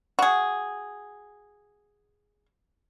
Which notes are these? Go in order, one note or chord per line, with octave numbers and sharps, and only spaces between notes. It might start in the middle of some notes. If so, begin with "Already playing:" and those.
F#4 G#4